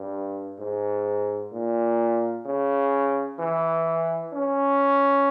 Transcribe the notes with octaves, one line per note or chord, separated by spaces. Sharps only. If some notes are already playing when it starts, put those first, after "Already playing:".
Already playing: G2
G#2
A#2
C#3
E3
C#4